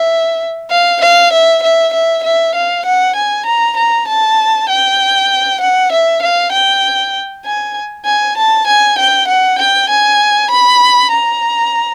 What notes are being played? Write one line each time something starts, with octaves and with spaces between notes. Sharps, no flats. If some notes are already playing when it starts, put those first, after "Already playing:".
Already playing: E5
F5
F5
E5
E5
E5
E5
F5
F#5
G#5
A#5
A#5
A5
G5
F#5
E5
F5
G5
G#5
G#5
A5
G#5
G5
F#5
G5
G#5
B5
A#5